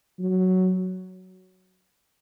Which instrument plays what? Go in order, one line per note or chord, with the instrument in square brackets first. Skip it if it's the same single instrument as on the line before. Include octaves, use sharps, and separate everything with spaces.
[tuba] F#3